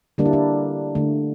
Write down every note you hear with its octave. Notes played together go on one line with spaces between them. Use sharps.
D3 G3 A#3 D4
E4
D4
D3 A3